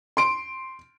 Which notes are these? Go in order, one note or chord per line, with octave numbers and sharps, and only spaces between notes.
C6 D7